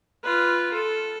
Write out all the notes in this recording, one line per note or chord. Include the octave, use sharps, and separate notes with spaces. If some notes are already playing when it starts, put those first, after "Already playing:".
F4 B4
A4